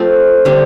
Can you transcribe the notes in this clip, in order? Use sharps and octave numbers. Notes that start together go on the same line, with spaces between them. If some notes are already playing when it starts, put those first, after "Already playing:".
Already playing: F3 A3 C4
D3 G3 C4